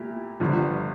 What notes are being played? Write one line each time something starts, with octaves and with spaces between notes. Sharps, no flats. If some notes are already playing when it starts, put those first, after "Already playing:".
Already playing: A#2 A3 E4 G4
G1 G2 D3 F3